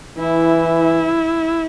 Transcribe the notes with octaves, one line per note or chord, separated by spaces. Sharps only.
E3 E4